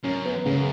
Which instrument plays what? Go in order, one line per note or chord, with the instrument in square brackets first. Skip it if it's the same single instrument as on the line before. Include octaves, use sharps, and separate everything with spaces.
[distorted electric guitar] F#2 [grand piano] C#4
[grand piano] B3
[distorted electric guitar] F#2 [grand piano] C#3